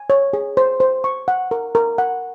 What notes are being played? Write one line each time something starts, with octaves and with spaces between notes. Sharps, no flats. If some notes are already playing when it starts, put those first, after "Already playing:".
Already playing: G#5
C#5
G#4
C5
C5
C#6
F#5
A#4
A#4
F#5